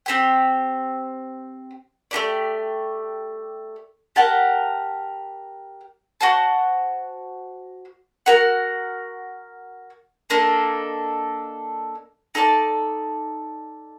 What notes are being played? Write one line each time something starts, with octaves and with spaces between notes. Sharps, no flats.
C4 G4 C5 G5
A3 D#4 G4 D5
G4 A#4 F#5 A5
F#4 C5 F#5 A5
F#4 A#4 F#5
A#3 D4 A4 D#5
D#4 A4 D5 A5